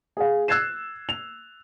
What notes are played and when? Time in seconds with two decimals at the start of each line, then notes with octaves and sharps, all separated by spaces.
0.17 G#4 F5
0.48 E6 F#6 G#6 A6 C7 E7
1.09 F7